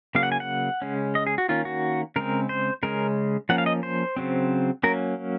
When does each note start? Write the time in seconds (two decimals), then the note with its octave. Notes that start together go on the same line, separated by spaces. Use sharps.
0.15 C#3 F#3 A#3 F5
0.23 F#5
0.32 G#5
0.40 F#5
0.82 C#3 G#3 C#4
1.15 D#5
1.27 G#4
1.38 F#4
1.49 D#3 A#3 C#4 F4
1.65 F#4
2.16 C#3 G#3 C4 A#4
2.49 C5
2.83 C#3 G#3 C#4 A#4
3.49 F3 A#3 C#4 F#5
3.58 F5
3.66 D#5
3.83 C5
4.17 C#3 F#3 C4
4.83 F#3 A#3 C#4 A#4